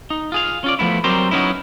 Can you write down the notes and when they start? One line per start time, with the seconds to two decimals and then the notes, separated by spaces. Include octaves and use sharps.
0.10 D#4
0.32 F4 G#4 F5
0.64 C#4 F4 D5
0.79 F3 A3 B3 E4
1.04 F#3 G3 C4 G4 A#4 C5
1.31 F#3 B3 C#4 D#4 E4